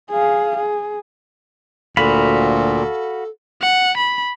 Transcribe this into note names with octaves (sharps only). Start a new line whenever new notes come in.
G#4 F5
G#4
D2 A#2 F#4 A4 F5 B5
F#5
B5